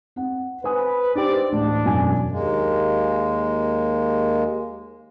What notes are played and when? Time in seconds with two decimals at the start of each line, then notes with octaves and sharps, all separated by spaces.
0.16 C4 F#5
0.64 B4 C5 G#5 D#6
1.15 G#2 C4 D4 G4 D5 G5
1.52 A1 D2 D4
1.85 E1 F#2 G#5
2.29 D#2 G#3 A#3